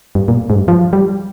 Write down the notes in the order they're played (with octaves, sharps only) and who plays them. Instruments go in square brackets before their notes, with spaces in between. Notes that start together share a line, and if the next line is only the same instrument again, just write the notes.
[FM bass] G2
A#2
G#2
G2
F3
G3